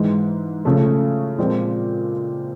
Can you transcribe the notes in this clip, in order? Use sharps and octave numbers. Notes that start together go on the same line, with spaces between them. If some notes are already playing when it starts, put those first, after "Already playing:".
Already playing: G#2 E3 G#3
C#3 F3 A3
A#2 F3 G#3 C4